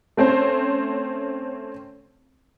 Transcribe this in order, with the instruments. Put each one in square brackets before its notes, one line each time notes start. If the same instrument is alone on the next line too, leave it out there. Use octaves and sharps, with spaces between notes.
[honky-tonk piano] A3 C4 C#4 C5